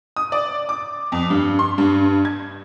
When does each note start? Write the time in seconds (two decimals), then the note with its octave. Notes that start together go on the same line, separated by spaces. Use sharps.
0.16 D#6
0.32 D5
0.69 D6
1.12 F2
1.30 G2
1.59 C6
1.78 G2
2.25 G#6